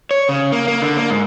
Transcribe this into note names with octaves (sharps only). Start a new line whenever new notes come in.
C#5
C#3
A#3
A#3
D3
A#3
G#2